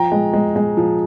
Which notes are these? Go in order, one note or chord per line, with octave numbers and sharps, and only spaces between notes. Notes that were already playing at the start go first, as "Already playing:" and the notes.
Already playing: F3 G5 A#5
G#3
G#3
G#3
F3